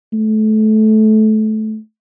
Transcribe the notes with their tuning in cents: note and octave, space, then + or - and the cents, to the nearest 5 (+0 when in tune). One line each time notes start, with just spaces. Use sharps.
A3 -25